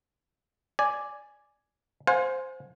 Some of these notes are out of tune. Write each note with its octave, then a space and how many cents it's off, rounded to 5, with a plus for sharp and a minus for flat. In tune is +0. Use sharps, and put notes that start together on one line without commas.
D5 +0 G#5 +0
C5 +0 F5 +40 G#5 +0